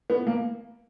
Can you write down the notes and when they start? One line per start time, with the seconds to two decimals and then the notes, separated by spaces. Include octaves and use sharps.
0.10 B3
0.27 A#3